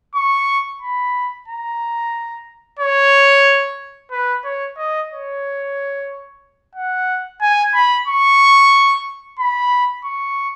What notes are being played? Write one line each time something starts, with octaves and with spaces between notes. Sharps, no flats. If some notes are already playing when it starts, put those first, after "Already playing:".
C#6
B5
A#5
C#5
B4
C#5
D#5
C#5
F#5
G#5
B5
C#6
B5
C#6